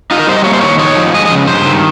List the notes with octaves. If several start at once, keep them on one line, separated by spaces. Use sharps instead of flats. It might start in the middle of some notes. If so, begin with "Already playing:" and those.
D#4 F4
A#4
G3 C5
D#5
A#3 C#5
C5
D#3 C#5
D#4 C#5
F3
G#3 D#5
D#5
C#3
G2 C5
D#3